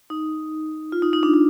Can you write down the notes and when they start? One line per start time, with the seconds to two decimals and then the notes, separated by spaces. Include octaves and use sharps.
0.10 D#4
0.92 F4
1.02 D#4
1.13 D#4
1.23 D4
1.34 D#4